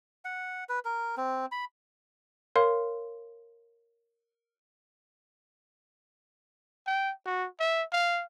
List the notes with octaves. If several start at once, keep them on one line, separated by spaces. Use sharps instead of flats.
F#5
B4
A#4
C4
B5
A#4 C#5 F5 C6
G5
F#4
E5
F5